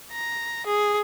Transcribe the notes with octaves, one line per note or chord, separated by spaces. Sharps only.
A#5
G#4